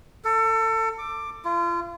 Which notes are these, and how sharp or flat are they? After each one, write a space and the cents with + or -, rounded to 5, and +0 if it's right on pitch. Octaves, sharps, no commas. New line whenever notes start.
A4 +30
D6 +10
F4 -35